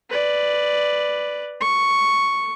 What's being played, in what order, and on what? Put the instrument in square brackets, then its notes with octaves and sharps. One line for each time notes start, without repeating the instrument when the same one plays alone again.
[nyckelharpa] B4 D5
C#6